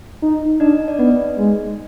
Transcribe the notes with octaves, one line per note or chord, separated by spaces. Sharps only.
D#4
D4 D#4 D#5
D5
B3 D#4 D#5
G#3